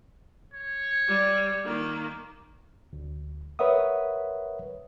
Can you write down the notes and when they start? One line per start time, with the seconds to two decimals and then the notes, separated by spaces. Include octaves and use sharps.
0.54 C#5
1.08 G3
1.65 D#3 A#3
2.93 D2
3.59 A#4 B4 C#5 E5 F#5 D#6